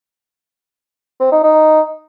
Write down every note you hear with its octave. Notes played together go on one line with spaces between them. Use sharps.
C4
D#4
D#4